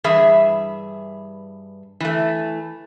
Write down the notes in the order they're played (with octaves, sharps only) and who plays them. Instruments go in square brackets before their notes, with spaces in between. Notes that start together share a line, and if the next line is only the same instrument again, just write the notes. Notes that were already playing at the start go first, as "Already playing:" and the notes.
[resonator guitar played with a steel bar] G2 E3 G#4 E5
E3 A3